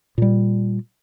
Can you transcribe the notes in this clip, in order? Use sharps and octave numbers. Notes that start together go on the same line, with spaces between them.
A#2 G3